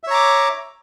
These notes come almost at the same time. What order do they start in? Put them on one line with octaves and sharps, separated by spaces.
E5 C#5 A#5 D6